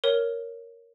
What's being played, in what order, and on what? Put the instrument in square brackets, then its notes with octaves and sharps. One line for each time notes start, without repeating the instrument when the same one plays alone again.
[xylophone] A#4 C#5